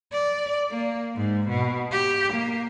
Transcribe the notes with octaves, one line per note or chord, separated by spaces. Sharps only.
D5
A#3
G#2
B2
G4
A#3